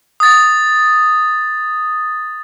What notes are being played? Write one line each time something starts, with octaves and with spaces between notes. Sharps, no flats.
D#6 A6